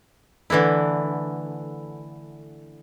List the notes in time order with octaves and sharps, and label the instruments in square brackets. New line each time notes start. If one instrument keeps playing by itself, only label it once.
[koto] D3 E3 A3 E4